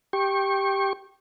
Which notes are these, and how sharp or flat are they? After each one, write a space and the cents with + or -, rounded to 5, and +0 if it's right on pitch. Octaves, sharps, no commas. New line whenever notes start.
G4 +0 C#6 -30